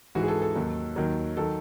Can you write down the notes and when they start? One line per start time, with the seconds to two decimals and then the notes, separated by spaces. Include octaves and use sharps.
0.15 G#2 E3 F#4
0.23 G#4
0.28 A4
0.42 A4
0.55 D#2 D#3 F#3
0.96 D#2 D#3 F#3
1.37 D#3 F#3 A4